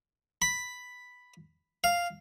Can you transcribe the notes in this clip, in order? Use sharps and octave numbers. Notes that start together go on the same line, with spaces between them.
B5
F5